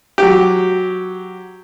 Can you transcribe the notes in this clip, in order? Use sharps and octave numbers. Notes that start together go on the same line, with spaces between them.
F#3 G4